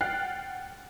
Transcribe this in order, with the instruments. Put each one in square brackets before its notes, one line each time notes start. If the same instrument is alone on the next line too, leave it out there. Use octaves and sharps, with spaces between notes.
[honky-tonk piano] F#5 G5 F6 F#6 A6 C7